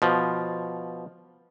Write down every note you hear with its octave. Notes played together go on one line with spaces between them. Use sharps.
B2 F3